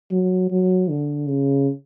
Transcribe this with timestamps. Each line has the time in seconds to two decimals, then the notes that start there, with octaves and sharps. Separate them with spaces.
0.12 F#3
0.51 F#3
0.90 D3
1.28 C#3